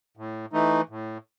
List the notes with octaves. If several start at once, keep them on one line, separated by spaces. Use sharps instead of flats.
A2
E3 A3 D#4
A2